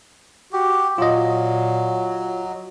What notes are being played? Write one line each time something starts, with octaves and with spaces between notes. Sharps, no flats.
F#4 G4
A#2 F#3 F4 D#5